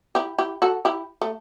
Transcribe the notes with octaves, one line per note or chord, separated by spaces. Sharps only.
E4 G4
E4 G4
F#4 A4
E4 G4
A3